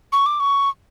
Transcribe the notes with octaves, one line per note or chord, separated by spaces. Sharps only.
C#6
D6
C#6